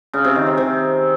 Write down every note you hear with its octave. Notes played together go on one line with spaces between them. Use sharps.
C#3
C3
D#3
C4
C3